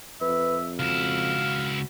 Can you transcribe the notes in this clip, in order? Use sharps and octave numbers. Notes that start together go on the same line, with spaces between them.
F2 B4 E5
C#2 E4 F#4 F5